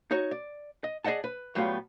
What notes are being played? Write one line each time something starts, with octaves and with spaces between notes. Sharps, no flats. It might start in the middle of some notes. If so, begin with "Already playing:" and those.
D#4 F#4 C#5
D5
D#5
G#4 D5 D#5 F#5 A5
B4
A2 F#3 G3 A3 B3 F4